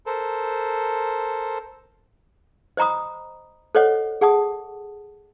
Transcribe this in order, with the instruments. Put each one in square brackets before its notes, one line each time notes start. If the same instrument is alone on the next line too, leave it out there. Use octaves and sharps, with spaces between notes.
[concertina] A4 A#4 C5
[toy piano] C5 D#5 A#5 B5 D#6
A4 C5 C#5 D#5 F#5
G#4 F#5 A5 D#6